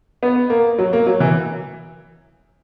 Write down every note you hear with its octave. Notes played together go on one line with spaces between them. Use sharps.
B3
A#3
F#3
A#3
F#3
E3